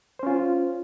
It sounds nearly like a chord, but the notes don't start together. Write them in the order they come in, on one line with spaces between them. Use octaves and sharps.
C5 C#4 F4